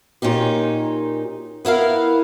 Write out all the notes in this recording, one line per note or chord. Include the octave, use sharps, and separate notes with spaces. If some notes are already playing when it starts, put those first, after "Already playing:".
A#2 C#4 D#4 G4
B3 E4 A#4 F5